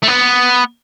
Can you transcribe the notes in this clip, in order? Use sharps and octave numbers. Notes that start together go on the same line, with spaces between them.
A3
B3